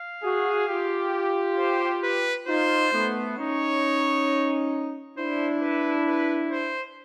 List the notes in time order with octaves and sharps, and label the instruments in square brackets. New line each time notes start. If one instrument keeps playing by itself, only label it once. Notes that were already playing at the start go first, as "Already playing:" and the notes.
Already playing: [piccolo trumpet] F5
[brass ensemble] F#4 G#4
F4 G4
[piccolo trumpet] C5
B4
[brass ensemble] D#4 F4 [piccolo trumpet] C5
[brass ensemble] A3 B3
[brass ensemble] C#4 D#4 [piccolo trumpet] C#5
[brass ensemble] D4 E4 [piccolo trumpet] C5
[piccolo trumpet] B4
B4
C5